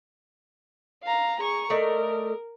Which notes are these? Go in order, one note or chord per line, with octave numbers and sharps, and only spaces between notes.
F5 A#5
G#4 A#5 C#6
A3 A#4 D5 D#5